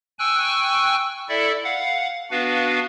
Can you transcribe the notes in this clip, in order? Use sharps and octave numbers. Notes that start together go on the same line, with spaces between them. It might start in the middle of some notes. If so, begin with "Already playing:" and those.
G5 G#5 C#6 E6 F#6
E4 A4 D5 E5
F5 F#5
B3 D4 F#4 B4 F5